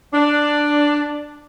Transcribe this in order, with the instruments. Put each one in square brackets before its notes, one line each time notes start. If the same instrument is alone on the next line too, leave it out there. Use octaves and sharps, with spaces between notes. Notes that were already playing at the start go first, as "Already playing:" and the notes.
[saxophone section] D4